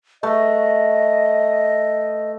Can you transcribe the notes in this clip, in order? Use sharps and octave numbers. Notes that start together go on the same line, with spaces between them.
A3 B4 D#5